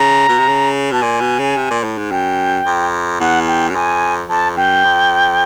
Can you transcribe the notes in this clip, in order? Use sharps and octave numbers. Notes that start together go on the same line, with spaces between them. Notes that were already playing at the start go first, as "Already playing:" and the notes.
Already playing: C#3 A#5
B2
C3
C#3
B2 A5
A#2 G#5
B2
C#3
C3
A#2
A2
G#2
F#2 G5
F2
E2 F#5
G5
F#2
F2 G#5
F2 A5
F#2 G5
F2